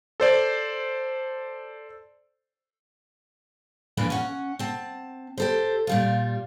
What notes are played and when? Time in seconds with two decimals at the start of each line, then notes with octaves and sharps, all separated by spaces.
0.20 A4 C5 D5
3.97 F2 A#2 E3 A#3 D4
4.10 C#4 F#5
4.59 C4 A5
5.38 G4 A4 C5
5.87 A#2 G3 F4